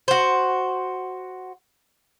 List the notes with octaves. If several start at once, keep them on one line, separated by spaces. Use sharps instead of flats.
F#4 C5